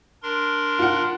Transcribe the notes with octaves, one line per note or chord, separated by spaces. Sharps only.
D4 A#4 C6
F4 F#5